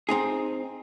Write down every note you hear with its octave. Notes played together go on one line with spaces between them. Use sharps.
C4 D#4 G#4